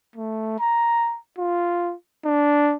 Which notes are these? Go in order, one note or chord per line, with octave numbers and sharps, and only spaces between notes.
A3
A#5
F4
D4